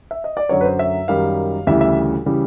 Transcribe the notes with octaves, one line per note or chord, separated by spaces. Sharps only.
E5
D#5
D5
F#2 D3 F#3 C#5
B4
C5
E5
F#2 D#3 G3 F5
D2 C#3 E3 G3 E5
E5
C#3 E3 G3